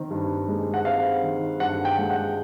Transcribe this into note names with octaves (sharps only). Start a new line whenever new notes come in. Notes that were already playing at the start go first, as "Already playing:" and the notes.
Already playing: D#3 C4
G2
G#3
F#5
C4 F5
D#3
G2 F#5
G5
G#3
F#5